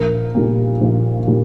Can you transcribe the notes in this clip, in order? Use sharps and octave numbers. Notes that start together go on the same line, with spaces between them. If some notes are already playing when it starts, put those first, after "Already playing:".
Already playing: A#1 A#4
A#2 G3 A#3
A#1
A#2 G3 A#3